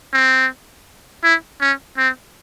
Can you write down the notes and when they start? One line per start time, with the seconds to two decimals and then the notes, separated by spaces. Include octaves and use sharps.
0.13 C4
1.23 E4
1.61 C#4
1.98 C4